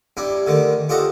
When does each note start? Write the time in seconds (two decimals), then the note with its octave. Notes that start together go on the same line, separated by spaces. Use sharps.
0.17 G2 D4 E4
0.47 D3 D#3 A3
0.89 F4 G4 A4 C5 D#5 F#5